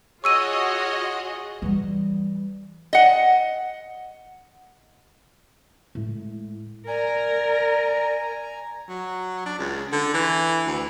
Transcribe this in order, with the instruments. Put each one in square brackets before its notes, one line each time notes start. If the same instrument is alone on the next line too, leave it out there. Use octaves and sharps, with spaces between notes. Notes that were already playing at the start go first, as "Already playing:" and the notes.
[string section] F4 F#4 D#5 [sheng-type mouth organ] G#4 C#5 [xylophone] C#6 E6 D#7
[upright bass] E3 G3
[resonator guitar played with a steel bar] D#5 F#5
[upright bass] A2 G#3
[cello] A#4 [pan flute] D5 [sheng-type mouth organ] G#5 A#5
[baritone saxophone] F#3
D4
C#2
D3
E3
D2